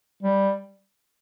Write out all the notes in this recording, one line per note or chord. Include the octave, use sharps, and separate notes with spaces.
G3